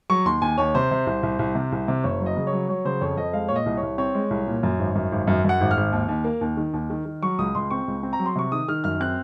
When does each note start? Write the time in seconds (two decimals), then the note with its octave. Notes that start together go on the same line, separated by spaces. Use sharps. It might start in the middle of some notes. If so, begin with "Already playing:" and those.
0.10 F#3 C#6
0.26 D#2 C6
0.42 D#2 G#5
0.58 D#2 C#5
0.75 C3 C5
0.91 C3
1.06 C2
1.23 C2
1.39 C2
1.55 C3
1.72 C2
1.88 C3
2.04 F#1 C#5
2.20 F#3
2.26 D#5
2.37 C#3
2.47 C#5
2.53 F#3
2.69 F#3 C#5
2.85 C#3 C5
3.01 F2 C#5
3.17 F2 D#5
3.33 G#3 F5
3.48 A#2 C#5
3.56 D#5
3.66 C2
3.77 C#5
3.82 C2
3.98 C4 C#5
4.15 G#3
4.30 C2
4.47 A#2
4.63 F#2
4.79 G#1
4.95 F#2
5.12 G#1
5.27 F#2
5.44 F#2 F#5
5.61 G#1
5.71 F6
5.77 G#1
5.92 D#2
6.08 D#2
6.24 A#3
6.41 D#2
6.57 D#3
6.74 D#2
6.90 D#3
7.05 D#3
7.22 F#3 C#6
7.38 C#2 D#6
7.55 C#2 C6
7.71 C4 C#6
7.88 C#2
8.03 C4
8.13 A#5
8.19 F#3
8.26 C6
8.35 C3 C#6
8.52 D#3 D#6
8.68 D#3 F6
8.84 F#2 F6
9.00 C4 F#6